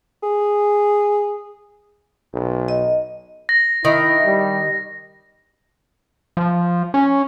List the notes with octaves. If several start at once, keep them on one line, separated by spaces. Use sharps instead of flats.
G#4
B1
D#5
A#6
D#3 E4
G3
F3
C#4